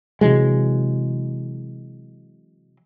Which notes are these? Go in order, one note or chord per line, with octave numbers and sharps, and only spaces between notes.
C3 E3 F#3 G#3